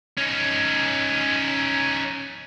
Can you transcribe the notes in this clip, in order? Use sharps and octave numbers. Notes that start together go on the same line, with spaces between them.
C#4 D#4